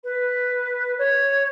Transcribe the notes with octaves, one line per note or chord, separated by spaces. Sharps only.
B4
C#5